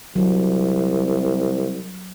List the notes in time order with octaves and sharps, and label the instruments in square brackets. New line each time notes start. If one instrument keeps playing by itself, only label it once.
[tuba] C2 [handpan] F#3